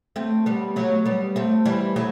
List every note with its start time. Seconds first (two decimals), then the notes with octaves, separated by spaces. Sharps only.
0.16 A3 C4
0.46 G3 B3
0.76 F#3 A3
1.06 G3 B3
1.36 A3 C4
1.66 E3 G3
1.96 F#3 A3